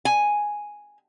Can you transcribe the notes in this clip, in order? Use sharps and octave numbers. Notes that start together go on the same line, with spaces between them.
G#5